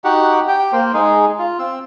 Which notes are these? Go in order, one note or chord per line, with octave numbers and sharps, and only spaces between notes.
D#4 F#4 G4 F#5
G4 G5
A#3 C5
G#3 D#4 G#4
F4
C4 E6